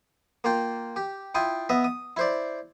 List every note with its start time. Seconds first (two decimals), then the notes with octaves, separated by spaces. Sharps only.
0.44 A#3 F4 G5
0.96 G4
1.35 E4 F4 G5 D#6
1.69 B3 D#5 E5
1.84 D#6
2.17 E4 C5 D5